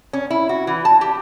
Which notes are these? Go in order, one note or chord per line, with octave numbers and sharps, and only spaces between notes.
C#4
E4
F#4
E3
A5
G4